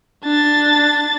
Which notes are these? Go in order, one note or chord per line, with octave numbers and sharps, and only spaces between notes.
D4 A6